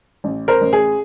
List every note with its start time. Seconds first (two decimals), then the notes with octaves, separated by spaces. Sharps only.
0.24 A1
0.48 A#4 C5
0.61 A1
0.73 G#4